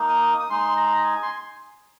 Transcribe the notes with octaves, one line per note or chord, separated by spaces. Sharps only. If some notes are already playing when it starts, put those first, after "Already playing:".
Already playing: A#3 D#4
D#6
D#6
G#3 D#4 C6
A#5
G#5
C6